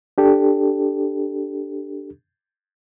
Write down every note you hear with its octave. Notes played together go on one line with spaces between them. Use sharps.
D4 G4 A4